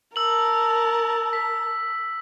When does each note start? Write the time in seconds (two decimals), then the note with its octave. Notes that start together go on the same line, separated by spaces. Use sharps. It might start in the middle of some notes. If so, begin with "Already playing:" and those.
0.16 A#4 A5 E6 F#7
1.33 B6